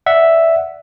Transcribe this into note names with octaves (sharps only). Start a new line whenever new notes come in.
D5 E5 F#5